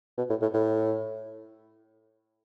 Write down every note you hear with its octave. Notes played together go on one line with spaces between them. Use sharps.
B2
A2
A2
A2